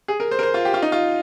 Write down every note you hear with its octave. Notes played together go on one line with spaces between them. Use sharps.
G#4
A#4
C5
A#4
C5
F4
G4
F4
D#4
F4